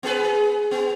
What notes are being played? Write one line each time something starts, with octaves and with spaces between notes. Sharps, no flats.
B3 G#4 B4
G#4
B3